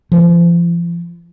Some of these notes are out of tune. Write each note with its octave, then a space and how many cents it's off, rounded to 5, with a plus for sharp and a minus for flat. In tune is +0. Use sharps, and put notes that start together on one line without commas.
F3 -35